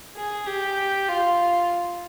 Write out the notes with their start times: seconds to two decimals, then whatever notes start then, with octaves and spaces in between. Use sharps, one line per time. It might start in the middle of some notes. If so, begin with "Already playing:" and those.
0.16 G#4
0.46 G4
1.08 F4